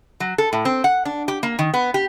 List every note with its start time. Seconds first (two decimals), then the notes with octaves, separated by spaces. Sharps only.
0.20 F#3
0.38 A4
0.53 A2
0.65 C4
0.84 F#5
1.05 D4
1.28 G4
1.43 A#3
1.59 D#3
1.74 B3
1.94 G4